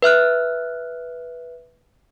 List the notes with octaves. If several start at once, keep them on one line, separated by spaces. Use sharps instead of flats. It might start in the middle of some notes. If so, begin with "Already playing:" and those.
B4 E5 F6 F#6